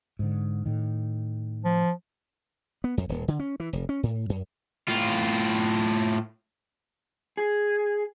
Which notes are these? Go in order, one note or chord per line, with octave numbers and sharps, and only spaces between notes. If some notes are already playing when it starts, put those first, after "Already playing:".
G#2 D3
A2 D#3
F3
B3
F2
D#1
D3
C#4
E3
F1
C#4
A2
F#2
A2 F4
G#4